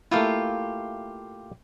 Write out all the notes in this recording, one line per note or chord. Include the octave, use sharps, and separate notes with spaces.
A3 A#3 E4 F4 G4 F5